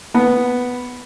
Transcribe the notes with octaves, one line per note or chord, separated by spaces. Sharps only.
B3